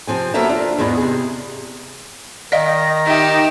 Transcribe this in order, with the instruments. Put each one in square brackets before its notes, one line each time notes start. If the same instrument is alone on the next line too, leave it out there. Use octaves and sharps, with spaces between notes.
[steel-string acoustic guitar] C3 F3 C4 G#5
F#3 A#3 B3 A4 E5 A#5
D4 F4
E2 G#2 G#3 B3
C3 G#4
[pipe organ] D#3 A#6 [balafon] D5 D#5 F5
[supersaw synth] D#4 [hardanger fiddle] G4 E5 [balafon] D#5